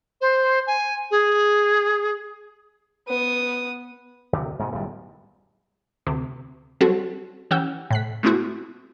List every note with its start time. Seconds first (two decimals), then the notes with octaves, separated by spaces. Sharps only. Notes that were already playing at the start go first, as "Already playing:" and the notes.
0.21 C5
0.67 G#5
1.11 G#4
3.08 B3 D#6
4.33 D2 C3
4.59 G#2 B2 G#3
4.72 D1 B1 F#2 G3
6.06 D2 C3
6.81 F#3 G3 C4 F#4 A4
7.51 E3 C#4 G4 F#5 E6 G6
7.90 A2 F#6 B6
8.23 G#3 A3 B3 C4 E4 F#4